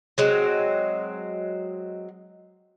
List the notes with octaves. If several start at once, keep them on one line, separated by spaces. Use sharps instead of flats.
F#3 G#3 C4